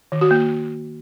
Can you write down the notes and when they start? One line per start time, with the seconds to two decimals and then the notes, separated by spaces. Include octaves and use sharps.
0.12 D#3
0.21 F#4
0.31 A#3